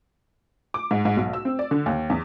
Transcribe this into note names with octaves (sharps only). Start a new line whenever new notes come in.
D6
G#2
G#2
B1
E6
C4
D5
D3
D#2
E2